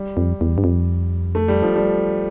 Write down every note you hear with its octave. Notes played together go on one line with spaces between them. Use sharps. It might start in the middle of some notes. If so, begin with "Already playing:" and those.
Already playing: G3
F2
E2
G2
F2
A3
G3
F3
G3